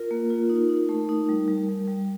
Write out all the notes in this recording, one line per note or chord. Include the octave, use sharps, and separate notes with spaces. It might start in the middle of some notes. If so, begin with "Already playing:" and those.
Already playing: F4 A#4
A#3
F4
D#4
D#4
A3
D#4
G3
G3
G3
G3